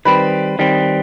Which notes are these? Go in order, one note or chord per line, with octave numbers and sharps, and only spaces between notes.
D#3 G3 C4 B4 B5
D#3 G3 C4